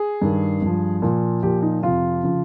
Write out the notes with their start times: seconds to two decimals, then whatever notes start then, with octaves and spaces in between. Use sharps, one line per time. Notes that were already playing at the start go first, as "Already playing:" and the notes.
Already playing: G#4
0.22 G2 D#3
0.62 G2 F3
1.02 A#2 F3
1.43 A#2 F3 G4
1.62 D#4
1.83 F2 C3 F3 F4
2.23 C#3 F3